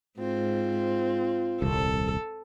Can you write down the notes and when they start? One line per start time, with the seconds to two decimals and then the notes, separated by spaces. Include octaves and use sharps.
0.20 G#2 C4 F4
1.62 D#1 C2 A4